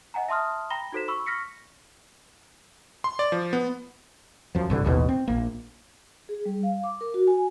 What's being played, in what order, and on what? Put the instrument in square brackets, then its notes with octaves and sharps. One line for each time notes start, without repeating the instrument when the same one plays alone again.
[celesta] D#5 F#5 G#5 A#5
E5 A5 C6 D#6 F6
G5 A#5 B5 A#6 G7
D#4 F#4 A4 C5 B6 E7
B5 C#6 E6
C#6 F6 A#6 B6 C#7
[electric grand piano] C6
D5
F3
B3
[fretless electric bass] F#2 F3
C2 G2 D3
A1 D#2 B2
C4
A#1 A#3
[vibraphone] G#4
G3
F5
D6
A#4
F#4
G#5